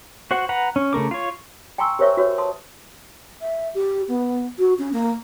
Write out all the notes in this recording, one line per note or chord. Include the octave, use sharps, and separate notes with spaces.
F#4 C5 F#5
B4 F#5 A#5
C#4
C#3 A3 A#4 D6
F4 C#5
G5 G#5 A#5 C6 C#6 E6
G4 A#4 C5 C#5 E5 C#6
F#4 B4 C#5
A5 C6 D#6
E5
G4
B3
F#4
C#4
A#3